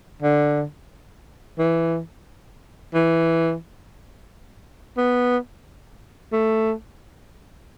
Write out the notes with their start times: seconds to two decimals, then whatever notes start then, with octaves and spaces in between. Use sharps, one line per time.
0.22 D3
1.58 E3
2.94 E3
4.97 B3
6.32 A3